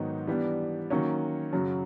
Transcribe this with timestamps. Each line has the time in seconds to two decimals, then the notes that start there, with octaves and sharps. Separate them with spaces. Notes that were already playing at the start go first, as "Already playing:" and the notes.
Already playing: G#2 D#3 F#3 B3 D#4
0.27 E3 G3 B3 D4
0.90 D#3 F#3 A#3 C#4
1.53 F#2 C#3 F#3